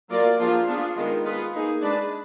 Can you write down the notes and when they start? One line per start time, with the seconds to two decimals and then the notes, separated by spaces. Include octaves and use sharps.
0.10 F#3 A#3 F4 A#4 D5
0.39 F3 A#3 D4 F4 G#4
0.68 B3 D4 F4 G#4
0.96 D#3 G#3 B3 F4
1.25 B3 F4 G#4 B4
1.54 A#3 D#4 G#4
1.82 G#3 D4 G#4 B4 D5